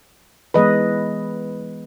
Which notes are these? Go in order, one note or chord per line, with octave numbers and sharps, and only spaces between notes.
E3 G#3 B3 B4 D#5